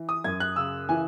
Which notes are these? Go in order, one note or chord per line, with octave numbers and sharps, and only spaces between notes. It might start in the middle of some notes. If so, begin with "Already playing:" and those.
Already playing: E3
D#6
F#2 G#6
F#6
C#3 E6
E3 G#5